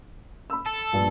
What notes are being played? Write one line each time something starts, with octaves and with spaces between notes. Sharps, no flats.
B5 E6
A4
A#1 G2